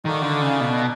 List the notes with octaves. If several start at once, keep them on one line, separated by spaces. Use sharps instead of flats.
D#3 D#4 F#4 A4 D5 F5
D3
C#3
B2